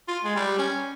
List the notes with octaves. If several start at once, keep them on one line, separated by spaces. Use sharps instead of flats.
F4
G#3
G3
C#4